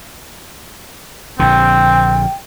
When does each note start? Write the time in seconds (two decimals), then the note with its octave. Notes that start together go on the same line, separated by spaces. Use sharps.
1.39 A#1 D3 C4 G5